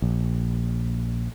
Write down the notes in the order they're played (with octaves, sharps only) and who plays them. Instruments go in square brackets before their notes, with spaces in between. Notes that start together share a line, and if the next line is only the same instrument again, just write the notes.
[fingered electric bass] A#1